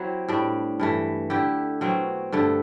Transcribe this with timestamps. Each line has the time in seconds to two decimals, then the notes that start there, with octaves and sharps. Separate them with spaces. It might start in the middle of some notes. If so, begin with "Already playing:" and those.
Already playing: F#3 C4 E4 G4
0.29 A2 G3 D4
0.80 G2 E3 A3
1.30 D3 A3 E4 G4
1.81 B2 F#3 C4
2.32 G2 D3 A3